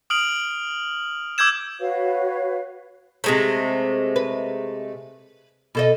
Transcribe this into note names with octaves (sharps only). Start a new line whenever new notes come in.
D#6 F6 D7 F#7
D6 E6 G6 G#6 E7
F#4 B4 C#5 F5
C3 G#3 A3
B4
B2 A4 D#5